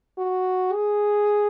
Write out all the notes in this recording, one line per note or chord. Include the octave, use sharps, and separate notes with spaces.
F#4
G#4